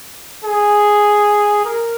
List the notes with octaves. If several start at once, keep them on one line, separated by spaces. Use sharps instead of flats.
G#4
A#4